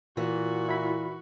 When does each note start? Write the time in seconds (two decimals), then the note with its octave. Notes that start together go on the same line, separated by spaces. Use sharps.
0.17 A#2 E3 F#4
0.69 E4 B5